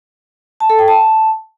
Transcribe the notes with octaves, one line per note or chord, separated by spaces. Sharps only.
A5
A4
G5
A5